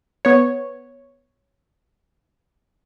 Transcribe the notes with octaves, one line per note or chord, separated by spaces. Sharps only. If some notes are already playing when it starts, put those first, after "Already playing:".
B3 C#5